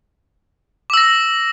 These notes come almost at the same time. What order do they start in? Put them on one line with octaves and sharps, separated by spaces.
D6 E6 A#6